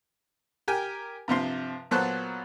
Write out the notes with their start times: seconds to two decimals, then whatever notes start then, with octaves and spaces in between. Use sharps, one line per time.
0.68 G4 A#4 G5 G#5
1.28 G2 C3 F3 C6
1.91 A#2 F#3 B3 A4 C5 F#6